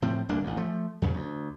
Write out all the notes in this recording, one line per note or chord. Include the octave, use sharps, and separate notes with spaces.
A2 F3 C4
D1 C2 A#3 D4
A1 D2
F3 A3
E2 G2 C#3 F#3
D2